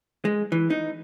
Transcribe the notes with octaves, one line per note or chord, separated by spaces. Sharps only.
G#3
E3
D#4